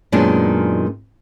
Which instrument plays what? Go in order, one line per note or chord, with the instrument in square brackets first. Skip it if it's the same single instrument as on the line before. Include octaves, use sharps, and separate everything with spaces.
[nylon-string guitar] F#2 A#2 D#3 G#3 B3 D4